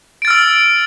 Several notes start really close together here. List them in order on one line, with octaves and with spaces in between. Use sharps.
D7 A6 F6 E6